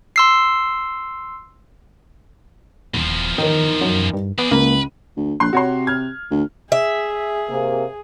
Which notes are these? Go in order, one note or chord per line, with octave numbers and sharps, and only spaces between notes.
C6 E6 C7
D#1 E2 F3
D#3 D#4 A#4
F#2
G2
B3 G#4 D5
C#2 A#3 B4
D2
A#1 C6 F#6
C3 F#4 C#5 C6
F6 G#6
D2
G#4 E5
C3 A#3